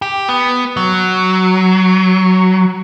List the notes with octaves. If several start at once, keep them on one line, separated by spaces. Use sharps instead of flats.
G4
B3
F#3